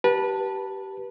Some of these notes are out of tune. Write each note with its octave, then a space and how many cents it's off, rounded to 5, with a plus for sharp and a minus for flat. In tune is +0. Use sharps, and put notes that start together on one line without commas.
G4 -20 B4 -25 A5 +5